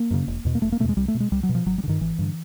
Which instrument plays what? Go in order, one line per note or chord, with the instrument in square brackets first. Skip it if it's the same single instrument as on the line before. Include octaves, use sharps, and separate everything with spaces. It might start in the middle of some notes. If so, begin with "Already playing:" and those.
Already playing: [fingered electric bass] A#3
F#2 C#3
E1
E2 B2
A#3
E1 A3
A#3
B2 A3
E2 G#3
C2 G3
A3
B2
G#3
C2 G3
F#3
B2
F3
G#1 F#3
G3
D3
G2 D#3
G#1 E3
G2 D3